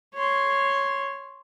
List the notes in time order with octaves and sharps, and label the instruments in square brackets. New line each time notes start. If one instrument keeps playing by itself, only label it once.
[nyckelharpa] C#5 C6